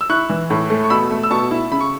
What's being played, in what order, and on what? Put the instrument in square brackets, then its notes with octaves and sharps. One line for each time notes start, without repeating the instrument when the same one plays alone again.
[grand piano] E6
[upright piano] E4 [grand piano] C#6 F#6
[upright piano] E3
A2
A3
[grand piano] C#6
[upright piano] B2 [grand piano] B5 E6
[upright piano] A3
[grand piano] E6
[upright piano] B2 [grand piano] A5 C#6
[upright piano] E4
[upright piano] C#3 [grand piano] B5
[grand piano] C#6